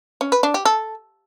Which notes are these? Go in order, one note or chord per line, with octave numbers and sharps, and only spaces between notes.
C#4
B4
D4
G4
A4